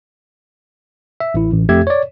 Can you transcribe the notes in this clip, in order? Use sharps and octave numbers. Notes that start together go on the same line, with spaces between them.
E5
A1 E4
A1
F2 A3 G4 E5 G#6
C#5 D5